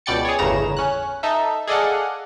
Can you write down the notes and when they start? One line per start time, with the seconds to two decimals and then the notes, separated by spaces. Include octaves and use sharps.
0.06 C#2 B2 D5 G5 A6 C#7
0.25 G#4 C#5
0.38 G1 E2 A2 C#3 A#5 E7
0.77 C#4 F#6
1.23 D#4 A4 E5
1.67 G#4 A4 D5 D#5 F5 F#5